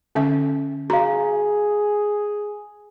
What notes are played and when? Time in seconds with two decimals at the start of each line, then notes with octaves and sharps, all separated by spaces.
0.15 D3 C#4 E5
0.90 F#4 G#4 F5 A#5